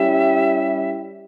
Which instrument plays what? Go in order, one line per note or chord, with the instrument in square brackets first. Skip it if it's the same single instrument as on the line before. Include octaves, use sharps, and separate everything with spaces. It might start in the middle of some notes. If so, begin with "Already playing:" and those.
Already playing: [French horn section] G3 C#4 E4 G4 [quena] E5